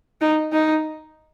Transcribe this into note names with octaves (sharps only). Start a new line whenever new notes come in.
D#4
D#4